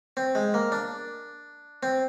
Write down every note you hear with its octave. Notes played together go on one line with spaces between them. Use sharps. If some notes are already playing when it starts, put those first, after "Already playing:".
C4
G#3
A#3
D4
C4